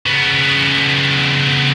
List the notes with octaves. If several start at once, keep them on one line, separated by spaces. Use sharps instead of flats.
C#3 B3